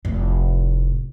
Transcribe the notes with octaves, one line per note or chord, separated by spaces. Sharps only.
F1 A2